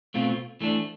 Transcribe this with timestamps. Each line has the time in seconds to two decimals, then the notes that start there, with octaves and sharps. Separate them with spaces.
0.14 B2 A3 C4 F4
0.61 E3 A3 D4